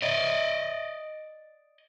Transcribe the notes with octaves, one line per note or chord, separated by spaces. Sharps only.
D5 D#5